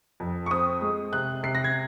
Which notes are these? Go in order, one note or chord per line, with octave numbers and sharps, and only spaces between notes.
F2
C#6
C4 D#6
G#3
C3 F#6
C3 C7
A#6
G#6